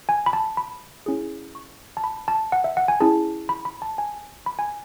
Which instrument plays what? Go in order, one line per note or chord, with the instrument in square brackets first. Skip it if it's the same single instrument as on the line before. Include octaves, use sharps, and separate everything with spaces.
[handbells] G#5
B5
A5
B5
C#4 E4 G#4
C#6
A5
B5
A5
F#5
E5
F#5
G#5
C#4 E4 G#4 A5
B5
B5
A5
G#5
B5
G#5